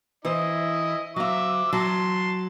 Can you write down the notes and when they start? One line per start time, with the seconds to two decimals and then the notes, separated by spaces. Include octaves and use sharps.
0.25 E3 E4 C5 D#5
1.16 F#3 E5 F5 D6
1.73 F#3 A5 C6